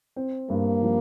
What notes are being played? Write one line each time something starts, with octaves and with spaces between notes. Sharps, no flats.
C4
G2 A#3
F3